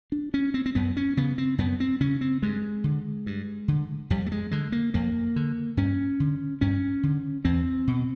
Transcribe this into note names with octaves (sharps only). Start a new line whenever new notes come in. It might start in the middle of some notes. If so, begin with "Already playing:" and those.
D4
C#4
C4
C4
F#2 B3
C#4
C#3 B3
C4
F#2 B3
C4
C#3 C#4
C4
G2 G#3
D3
G2
D3
F2 G3
A3
G#3
D3 G#3
A#3
F2 A#3
D3
G2 C#4
D3
G2 C#4
D3
E2 C4
B2